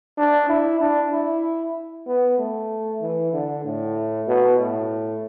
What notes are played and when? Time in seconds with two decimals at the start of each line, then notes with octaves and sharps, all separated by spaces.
0.17 D4
0.49 E4
0.80 D4
1.12 E4
2.07 B3
2.38 A3
3.01 E3
3.33 D3
3.64 A2
4.27 B2
4.59 A2